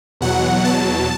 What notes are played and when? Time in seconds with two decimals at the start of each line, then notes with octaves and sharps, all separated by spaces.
0.21 E2 B2 F#3 F#5
0.65 A5